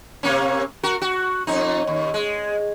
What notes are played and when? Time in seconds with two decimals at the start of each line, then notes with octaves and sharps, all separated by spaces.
0.23 C3 A#3 C#4
0.83 F#4 A#4
1.01 F#4
1.47 F2 C#4 D#4
1.87 D#2
2.14 G#3